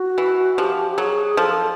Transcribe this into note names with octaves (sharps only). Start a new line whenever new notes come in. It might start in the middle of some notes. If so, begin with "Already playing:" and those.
Already playing: F#4
E3
F3 G4
G4
F#3 G#4
F3 A4